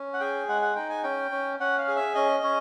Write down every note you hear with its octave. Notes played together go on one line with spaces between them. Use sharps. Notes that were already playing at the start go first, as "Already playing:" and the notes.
Already playing: C#4
F#5
G#4 G5
G#3 F#5
F#5
D#4 G5
G#5
C#4 G5
C#4
C#4 F#5
F5
G#4
E5
C#4 D#5
C#4